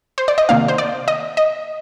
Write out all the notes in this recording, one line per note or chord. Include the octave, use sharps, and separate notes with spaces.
C5
D5
D#5
C3 D#3 A#3 D4 F5
C5
D5
D#5
D#5